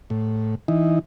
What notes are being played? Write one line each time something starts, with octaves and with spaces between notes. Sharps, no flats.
A2
E3 D#4